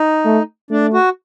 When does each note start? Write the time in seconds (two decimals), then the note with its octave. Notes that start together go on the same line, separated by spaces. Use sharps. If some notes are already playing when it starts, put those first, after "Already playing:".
Already playing: D#4
0.25 A3
0.70 A3 D4
0.93 F#4